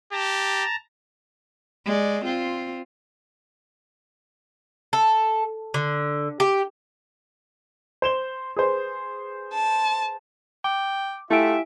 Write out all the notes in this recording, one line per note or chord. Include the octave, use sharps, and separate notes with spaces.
G4 A5 A#5
G#3 D5
C4 F4
A4
D3
G4
C5 E7 G7
G#4 B4 C5
A5
G5 D6
A3 E4 F4 G4 E5 G#5 D7